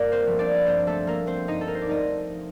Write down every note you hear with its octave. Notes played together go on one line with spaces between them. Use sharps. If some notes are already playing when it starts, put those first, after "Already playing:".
Already playing: G2 A#3 A#4 D5
C4 C5
F3 A3
D4 D5
G2 C4 C5
A3 A4
F3 A3 A#3 A#4
C4 C5
G2 D#4 D#5
A4
A#4
C5
D5
F3 A3 D#4 D#5